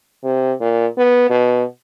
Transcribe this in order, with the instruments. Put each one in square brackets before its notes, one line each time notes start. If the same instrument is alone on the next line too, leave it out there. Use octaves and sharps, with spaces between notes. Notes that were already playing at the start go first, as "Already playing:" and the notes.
[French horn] C3
A#2
B3
B2